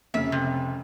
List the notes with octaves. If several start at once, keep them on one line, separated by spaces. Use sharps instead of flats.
F1 C#3 E5
C3